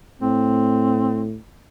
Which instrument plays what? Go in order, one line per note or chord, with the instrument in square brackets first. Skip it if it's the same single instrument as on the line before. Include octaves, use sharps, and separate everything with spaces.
[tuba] A2 [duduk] C4